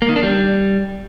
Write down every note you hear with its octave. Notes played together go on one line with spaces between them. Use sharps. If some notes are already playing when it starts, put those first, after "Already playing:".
A#3
D#3
D4
G3